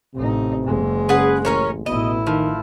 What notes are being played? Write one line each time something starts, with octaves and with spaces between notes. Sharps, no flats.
A1 C3 D#4
F#1 G#3
C#3 G#4 B4 F#5
A1 C#4 A#4 C#5
A1 B2 E4 D#5
D#3 F3